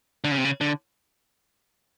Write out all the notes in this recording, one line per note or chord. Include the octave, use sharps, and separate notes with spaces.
D3
C#3
C3
C#3
D3